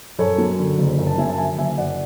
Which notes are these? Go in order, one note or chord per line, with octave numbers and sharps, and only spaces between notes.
F#2 A4 C#5
F#3
D3
F#1
F#2
A5
F#3 E5 G#5
A5
D3 E5 G#5
F#1 E5 G#5
F#2 D5 F#5